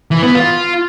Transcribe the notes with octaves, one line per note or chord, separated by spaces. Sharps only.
E3
B3
F4